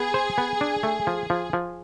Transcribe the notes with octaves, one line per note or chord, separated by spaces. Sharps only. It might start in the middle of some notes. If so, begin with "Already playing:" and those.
Already playing: B3 G#4
C5
B3
D4
A3
F3
F3
F3